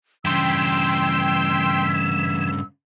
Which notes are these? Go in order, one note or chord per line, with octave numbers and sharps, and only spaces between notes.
G2 C#3 E3 G5 C6 E6